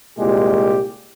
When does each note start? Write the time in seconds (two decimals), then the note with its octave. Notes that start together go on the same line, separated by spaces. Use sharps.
0.17 C2 A#2 G#3 G4